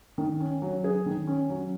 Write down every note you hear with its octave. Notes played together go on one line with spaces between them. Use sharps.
D#3
C#4
F#3
G#4
D#3
C#4
F#3